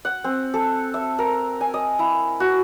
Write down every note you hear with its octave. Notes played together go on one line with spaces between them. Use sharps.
F#5
C4
A4
E5
A#4
G#5
D#5
E4
F#4